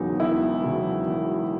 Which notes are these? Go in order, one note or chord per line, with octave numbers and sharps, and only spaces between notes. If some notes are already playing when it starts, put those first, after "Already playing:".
Already playing: E1 E2 C#3 F#3 D#4
E1 E4
E2 C#3 F#3
E1